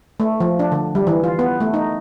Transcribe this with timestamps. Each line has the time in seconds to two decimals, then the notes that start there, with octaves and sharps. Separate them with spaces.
0.20 A3
0.40 F3
0.59 D4
0.72 D3
0.95 G3
1.07 E3
1.24 F4
1.39 B3
1.61 A3
1.74 D#4